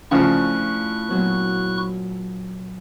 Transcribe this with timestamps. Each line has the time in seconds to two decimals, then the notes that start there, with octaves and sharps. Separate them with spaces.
0.11 C#3 F3 A3 D4 E4 C#6 F#6
1.09 A#2 F#3 B3